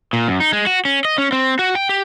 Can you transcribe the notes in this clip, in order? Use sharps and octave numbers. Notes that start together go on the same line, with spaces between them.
A#2
F#2
D#4
G#3
F#4
C#4
D#5
C#4
C4
F#4
G5
G4